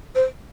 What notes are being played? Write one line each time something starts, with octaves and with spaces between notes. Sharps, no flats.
C5